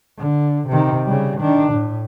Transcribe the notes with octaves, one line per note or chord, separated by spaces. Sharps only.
D3
C3 D#3
C#3 G3
D#3 D4
A2